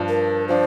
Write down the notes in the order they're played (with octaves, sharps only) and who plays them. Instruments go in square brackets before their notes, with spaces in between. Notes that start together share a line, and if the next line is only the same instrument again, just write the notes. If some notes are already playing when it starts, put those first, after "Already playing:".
Already playing: [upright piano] G2 F3 D4 F4
[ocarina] A#4
[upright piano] F3 D4 [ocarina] C5